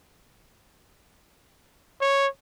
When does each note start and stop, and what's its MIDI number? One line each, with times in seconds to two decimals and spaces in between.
2.01 2.27 73